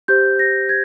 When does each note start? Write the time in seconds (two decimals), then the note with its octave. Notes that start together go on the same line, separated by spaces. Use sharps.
0.08 G4 C5 G6
0.39 A#6
0.69 G#6